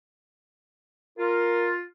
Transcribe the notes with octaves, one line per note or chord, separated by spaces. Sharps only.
F4 A#4